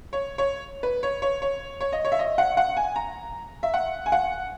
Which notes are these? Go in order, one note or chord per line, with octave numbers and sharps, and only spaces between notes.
C#5
C#5
B4
C#5
C#5
C#5
C#5
D#5
C#5
E5
D#5
F#5
F#5
G#5
A#5
E5
F#5
G#5
F#5